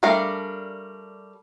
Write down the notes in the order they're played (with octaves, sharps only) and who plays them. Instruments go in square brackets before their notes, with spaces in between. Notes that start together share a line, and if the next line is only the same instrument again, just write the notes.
[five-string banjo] G3 A3 D4 A#4 F5